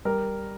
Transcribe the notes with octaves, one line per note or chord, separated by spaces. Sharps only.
G3 A#4